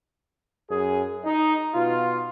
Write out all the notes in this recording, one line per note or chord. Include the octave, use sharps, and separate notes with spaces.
F#2 G#4
D#4
B2 F4